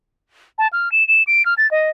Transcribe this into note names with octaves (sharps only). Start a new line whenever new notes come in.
A5
F6
E7
E7
D7
F6
A6
D#5